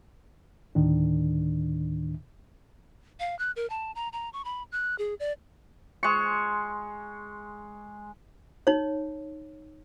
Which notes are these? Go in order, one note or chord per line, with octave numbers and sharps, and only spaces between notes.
D2 A2 D#3 D4
F5
F#6
A#4
A5
A#5
A#5
C#6
B5
F#6
G#4
D5
G#3 C#6
D#4 C#5